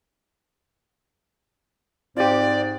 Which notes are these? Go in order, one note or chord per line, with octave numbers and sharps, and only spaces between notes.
G#2 C4 F4 G4 D5